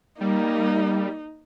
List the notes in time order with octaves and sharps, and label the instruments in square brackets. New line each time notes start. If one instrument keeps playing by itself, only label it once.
[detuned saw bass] G3 [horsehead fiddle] A#3 [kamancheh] D#4